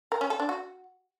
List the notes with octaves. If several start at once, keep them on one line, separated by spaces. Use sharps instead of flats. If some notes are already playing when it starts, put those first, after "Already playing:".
A#4
C#4
A4
D4
F#4